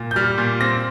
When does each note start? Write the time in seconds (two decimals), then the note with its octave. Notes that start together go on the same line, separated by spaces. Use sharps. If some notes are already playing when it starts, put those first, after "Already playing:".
Already playing: A#2
0.11 G6
0.16 G3 F6
0.38 A#2
0.61 C4 A#6